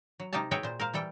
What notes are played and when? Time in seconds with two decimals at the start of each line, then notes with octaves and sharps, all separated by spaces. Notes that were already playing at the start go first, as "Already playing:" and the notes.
0.20 F#3
0.33 C3 D#4 G4 D#5 F5 A5
0.51 F#4 G#4 B4 C#5 E5 G5
0.63 A#2 C5
0.80 A#4 C5 F5
0.94 E3 G3 A4 G5